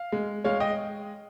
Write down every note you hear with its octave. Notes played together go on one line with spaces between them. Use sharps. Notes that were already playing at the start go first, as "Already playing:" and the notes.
Already playing: F5
G#3
G#3 C#5 F5
D#5 G5